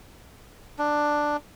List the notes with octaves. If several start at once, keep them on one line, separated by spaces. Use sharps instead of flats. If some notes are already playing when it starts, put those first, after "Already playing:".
D4